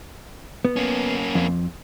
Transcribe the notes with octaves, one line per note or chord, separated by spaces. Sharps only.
B3
A#3 C#4
F2